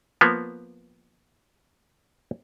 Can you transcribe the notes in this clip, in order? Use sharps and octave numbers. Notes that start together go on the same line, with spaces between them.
F3 A#3 B3